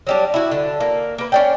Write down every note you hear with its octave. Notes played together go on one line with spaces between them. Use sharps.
F#3 G3 D4
E4 F#4
D3
A#3
A#3 B4
C#4 D4 G5